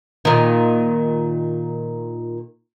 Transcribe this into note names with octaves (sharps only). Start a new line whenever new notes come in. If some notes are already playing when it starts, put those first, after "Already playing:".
A#2 D#3